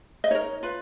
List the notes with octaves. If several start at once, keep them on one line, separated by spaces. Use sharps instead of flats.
D#5
D#4 A#4 C#5
F4 B4